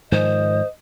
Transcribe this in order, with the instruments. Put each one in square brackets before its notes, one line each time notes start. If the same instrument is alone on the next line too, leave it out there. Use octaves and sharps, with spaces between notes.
[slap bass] G#2 D#3 F3 [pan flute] C5 [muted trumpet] D#5